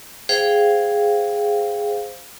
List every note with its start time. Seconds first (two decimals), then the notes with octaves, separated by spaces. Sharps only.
0.29 G#4 C5 F5 G5